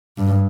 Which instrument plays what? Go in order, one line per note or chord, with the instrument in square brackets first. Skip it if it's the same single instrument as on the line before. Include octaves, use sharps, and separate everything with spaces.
[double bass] G2